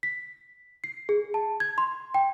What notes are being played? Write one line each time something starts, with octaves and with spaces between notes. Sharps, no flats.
B6
C7
G#4
A5
G#6
C6
G5